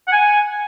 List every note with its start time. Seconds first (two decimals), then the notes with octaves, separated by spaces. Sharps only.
0.08 F#5
0.12 G#5